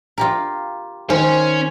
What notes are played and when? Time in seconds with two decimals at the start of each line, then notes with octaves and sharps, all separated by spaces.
0.18 F4 G4 A#4
1.10 D#3 C#4 C5